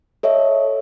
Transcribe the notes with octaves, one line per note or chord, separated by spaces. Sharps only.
A4 C#5 D#5 E5